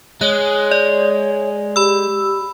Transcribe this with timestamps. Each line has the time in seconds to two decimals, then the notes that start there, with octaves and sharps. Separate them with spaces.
0.21 G#3 C#5 F#6
0.71 D5
1.76 G4 B5 E6